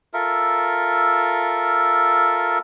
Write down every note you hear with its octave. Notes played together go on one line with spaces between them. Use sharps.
F4 A4 A#4 E5